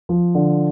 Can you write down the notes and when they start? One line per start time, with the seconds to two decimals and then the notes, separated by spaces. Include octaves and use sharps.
0.09 F3
0.35 D3